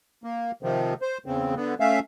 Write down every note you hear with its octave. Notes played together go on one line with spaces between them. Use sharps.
A#3
C3 D#3 F3
C5
E2 C#3 C4
D3 B3
A3 C#4 E5 F5